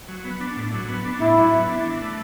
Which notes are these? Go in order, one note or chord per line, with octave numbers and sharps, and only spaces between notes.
F#3
B3
D4
A2
F#3
B3
D4
A2 E4
F#3
B3
D4
E3
A3